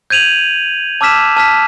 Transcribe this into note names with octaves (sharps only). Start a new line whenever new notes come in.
G6 G#6 D#7 F7 F#7
A5 D6 E6 F6 B6 E7
A5 F6 B6